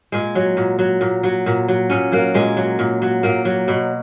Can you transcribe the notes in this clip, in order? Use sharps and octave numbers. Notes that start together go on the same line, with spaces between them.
A#2 G#3
F#3
A#2
F#3
A#2
F#3
A#2
F#3
A#2 C#4
F#3 A#3
A#2 G#3
F#3
A#2
F#3
A#2 A#3
F#3
B2